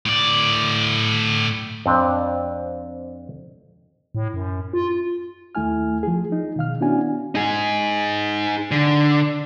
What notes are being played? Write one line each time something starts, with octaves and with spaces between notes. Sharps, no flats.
A2 D5
F2 C4 D4
A2
F#2
F4
D#2 A3 E4 G#5 F6
F3 G#4
D#4
B2 D#3 F5 F6
B3 C#4 D4 E4 F#4 G#5
D#4 G#4
D3